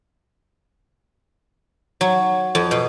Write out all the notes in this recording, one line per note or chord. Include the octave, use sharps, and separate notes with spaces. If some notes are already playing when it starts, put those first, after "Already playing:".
F#3
F2
B2